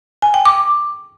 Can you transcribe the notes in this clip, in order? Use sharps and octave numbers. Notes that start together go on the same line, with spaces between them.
G#5
G5
D6